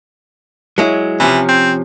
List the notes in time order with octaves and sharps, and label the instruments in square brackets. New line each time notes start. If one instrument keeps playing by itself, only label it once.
[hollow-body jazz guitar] F#3 G#3 E4
[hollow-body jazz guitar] C3 F3 C#4 [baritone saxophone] E3
[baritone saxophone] C4